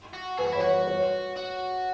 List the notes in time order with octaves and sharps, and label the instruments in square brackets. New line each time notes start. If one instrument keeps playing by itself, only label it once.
[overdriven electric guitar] F#4
[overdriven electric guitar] G#4 [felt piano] B4
[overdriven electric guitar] F#4
[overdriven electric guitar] E4 [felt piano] C#5
[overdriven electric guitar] F#4
[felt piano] B4
C#5
[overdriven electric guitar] F#4